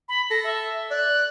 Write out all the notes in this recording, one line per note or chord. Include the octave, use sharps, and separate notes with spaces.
B5
A4 A#6
E5
D5 F#6